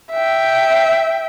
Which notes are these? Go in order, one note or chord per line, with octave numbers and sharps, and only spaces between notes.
E5 G5